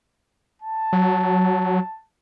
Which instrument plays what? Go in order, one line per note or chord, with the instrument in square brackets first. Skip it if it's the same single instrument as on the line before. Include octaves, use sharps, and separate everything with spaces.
[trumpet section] A5
[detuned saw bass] F#3